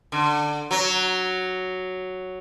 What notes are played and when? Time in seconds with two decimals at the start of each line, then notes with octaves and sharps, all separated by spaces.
0.12 D3
0.71 F#3